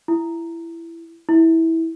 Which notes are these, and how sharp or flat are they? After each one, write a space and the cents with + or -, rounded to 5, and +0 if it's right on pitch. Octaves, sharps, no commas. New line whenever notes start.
E4 +15
E4 -15